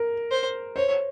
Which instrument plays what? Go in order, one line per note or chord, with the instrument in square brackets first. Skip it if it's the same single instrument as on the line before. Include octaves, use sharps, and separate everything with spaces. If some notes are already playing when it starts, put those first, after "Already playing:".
Already playing: [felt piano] A#4
[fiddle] C5
[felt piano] C5 [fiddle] C#5